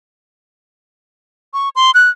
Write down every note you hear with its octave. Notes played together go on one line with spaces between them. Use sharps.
C#6
C6
F#6